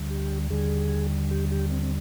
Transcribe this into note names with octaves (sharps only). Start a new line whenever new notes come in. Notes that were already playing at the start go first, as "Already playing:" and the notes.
Already playing: D2 D3 G3
G4
D#2 D3 G3 G#4
G4
G4
C4
C4